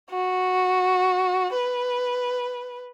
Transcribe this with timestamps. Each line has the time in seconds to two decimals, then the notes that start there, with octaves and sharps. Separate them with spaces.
0.11 F#4
1.53 B4